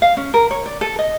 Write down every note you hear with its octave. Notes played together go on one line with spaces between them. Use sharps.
F5
C#4
A#4
C#5
D5
A4
D#5